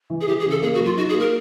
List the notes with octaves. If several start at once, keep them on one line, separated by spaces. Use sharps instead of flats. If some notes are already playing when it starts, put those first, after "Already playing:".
E3
G#4
E3 G4
G#4
C#3
A4
A#3 G#4
F#4
F#3 F4
D#4 F#4
G#4
A#3
A#4